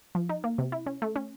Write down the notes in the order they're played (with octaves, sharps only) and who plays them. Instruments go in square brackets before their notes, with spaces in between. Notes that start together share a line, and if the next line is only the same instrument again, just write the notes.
[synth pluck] F3
D#4
A#3
C3
E4
C#4
A3
C#4